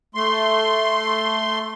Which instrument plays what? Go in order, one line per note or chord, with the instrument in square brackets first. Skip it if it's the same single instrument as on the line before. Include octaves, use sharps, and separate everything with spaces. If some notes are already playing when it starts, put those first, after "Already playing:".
[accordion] A3 C6